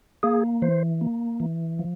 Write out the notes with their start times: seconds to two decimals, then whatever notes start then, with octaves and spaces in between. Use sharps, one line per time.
0.23 A#3 G#4
0.62 E3 C5
1.01 A#3
1.40 E3
1.79 F3